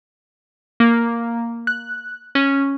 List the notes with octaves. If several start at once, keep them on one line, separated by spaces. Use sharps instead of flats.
A#3
F#6
C#4